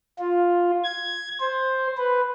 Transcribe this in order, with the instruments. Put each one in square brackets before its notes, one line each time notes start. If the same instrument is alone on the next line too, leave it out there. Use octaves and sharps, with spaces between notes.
[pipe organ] F4
G#6
C5
B4